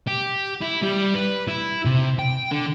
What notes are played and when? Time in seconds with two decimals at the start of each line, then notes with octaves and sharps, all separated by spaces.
0.08 G4
0.62 E4
0.83 G3
1.15 B4
1.48 E4
1.85 C3
2.19 G5
2.51 D3